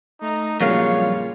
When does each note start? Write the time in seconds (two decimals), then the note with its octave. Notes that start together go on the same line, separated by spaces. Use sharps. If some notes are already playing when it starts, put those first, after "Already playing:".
0.21 A3 D#4 A#5
0.60 F2 A#2 C#3 F#3 G3 F4 C#5 F5